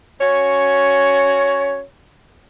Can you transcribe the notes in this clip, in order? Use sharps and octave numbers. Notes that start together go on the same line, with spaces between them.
C#4 F#4 C#5